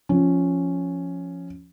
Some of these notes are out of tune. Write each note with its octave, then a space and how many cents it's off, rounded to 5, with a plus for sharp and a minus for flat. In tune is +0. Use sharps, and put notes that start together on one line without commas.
F3 +0 C#4 +0